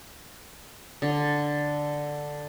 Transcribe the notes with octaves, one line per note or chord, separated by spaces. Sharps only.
D3